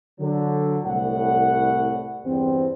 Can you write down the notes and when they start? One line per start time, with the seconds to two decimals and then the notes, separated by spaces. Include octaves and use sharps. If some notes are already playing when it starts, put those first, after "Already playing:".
0.20 D3 F#3
0.85 C2 A2 F#5
2.25 E2 G2 C4